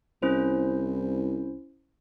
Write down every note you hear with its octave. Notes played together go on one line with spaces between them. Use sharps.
C2 C#4 E4 C5